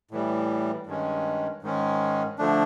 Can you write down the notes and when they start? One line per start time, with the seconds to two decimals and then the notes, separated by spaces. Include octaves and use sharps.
0.11 A2 E3 G3
0.87 G2 D#3 G#3 C#4
1.62 G#2 D#3 G#3 C#4
2.38 D3 F3 A3 D4